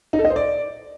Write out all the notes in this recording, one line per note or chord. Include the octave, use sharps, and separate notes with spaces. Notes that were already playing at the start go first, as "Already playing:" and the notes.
D#4
A4
D#5
C5
D5